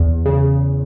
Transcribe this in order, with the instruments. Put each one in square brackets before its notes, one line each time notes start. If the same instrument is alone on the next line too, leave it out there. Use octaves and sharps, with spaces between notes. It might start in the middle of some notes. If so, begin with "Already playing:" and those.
Already playing: [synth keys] E2
C#3